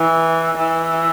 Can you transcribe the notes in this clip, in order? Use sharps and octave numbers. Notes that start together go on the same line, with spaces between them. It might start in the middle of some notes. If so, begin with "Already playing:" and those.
Already playing: E3
E3